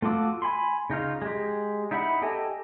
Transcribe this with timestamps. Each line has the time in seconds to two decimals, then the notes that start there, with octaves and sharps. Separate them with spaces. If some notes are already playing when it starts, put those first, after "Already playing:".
0.02 A3 F4 F#4 D6 E6
0.42 G#5 B5 C6
0.90 C#3 D#4 F4 F6
1.22 G#3 G4
1.91 D#4 E4 E5 F#5 B5
2.22 G4 A4 D#5 G#5